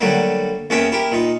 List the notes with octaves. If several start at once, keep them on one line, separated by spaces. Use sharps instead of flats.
D3 F#3 G3 A3 A#3
E2 A#3 C#4 E5 G5 G#5
E4 G4 A#4
A#2 D#4